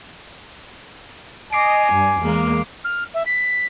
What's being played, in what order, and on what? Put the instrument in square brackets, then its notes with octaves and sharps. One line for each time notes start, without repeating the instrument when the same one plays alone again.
[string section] D#5 [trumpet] G#5 [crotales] D6 C7 D7
[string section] G2
E2 G#3 A#3
[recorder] F6
E5
B6